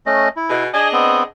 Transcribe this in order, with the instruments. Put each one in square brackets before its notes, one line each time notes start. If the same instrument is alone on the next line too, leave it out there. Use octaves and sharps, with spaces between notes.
[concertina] A3 C#4 D#5
E4
[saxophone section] B2 G#4
[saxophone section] D4 G#4 D#5 [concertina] G#5
[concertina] B3 C4